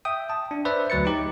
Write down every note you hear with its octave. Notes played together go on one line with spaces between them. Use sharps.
E5 G5 D#6
A5
D4
B4 C5 D5 E5
D2 F#3 B4 A6 C#7
D#4 G4